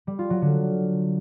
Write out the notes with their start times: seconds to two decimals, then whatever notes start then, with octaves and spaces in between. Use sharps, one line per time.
0.07 G3
0.19 F4
0.30 F#3
0.42 D3